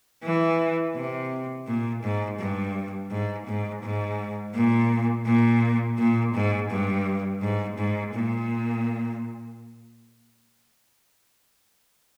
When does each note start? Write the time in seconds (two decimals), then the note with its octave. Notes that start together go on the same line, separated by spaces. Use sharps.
0.23 E3
0.95 C3
1.67 A#2
2.02 G#2
2.39 G2
3.11 G#2
3.47 G#2
3.83 G#2
4.54 A#2
5.26 A#2
5.98 A#2
6.34 G#2
6.70 G2
7.41 G#2
7.78 G#2
8.14 A#2